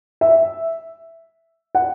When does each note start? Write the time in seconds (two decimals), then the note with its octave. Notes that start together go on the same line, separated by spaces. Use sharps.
0.21 E5
1.75 F#5